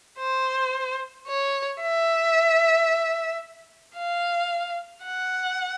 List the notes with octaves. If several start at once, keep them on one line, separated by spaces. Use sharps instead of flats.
C5
C#5
E5
F5
F#5